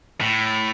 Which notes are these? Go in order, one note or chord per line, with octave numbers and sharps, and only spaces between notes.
A2